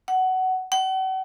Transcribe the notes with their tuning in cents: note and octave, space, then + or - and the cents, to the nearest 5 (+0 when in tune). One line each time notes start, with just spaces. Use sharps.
F#5 +15
F#5 +40